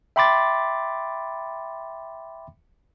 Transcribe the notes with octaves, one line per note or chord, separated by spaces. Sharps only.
E5 G5 B5 C6 D6 A6